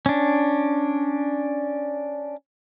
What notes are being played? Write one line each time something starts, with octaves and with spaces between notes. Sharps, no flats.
C#4 D4